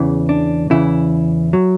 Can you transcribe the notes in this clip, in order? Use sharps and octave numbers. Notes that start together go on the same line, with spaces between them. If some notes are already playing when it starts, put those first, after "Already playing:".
Already playing: E2 C#3 E3
D4
E2 C#3 E3 E4
F#3